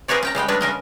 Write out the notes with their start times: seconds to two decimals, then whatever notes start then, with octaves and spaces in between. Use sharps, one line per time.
0.08 C4 G#4 A#4 B4 C#5 D5
0.23 C#4 G5 A#5
0.35 C#3 G3 G#3 G5
0.48 G3 G#3 C#4 D4 B4
0.61 C#3 C#4 A#4 D#5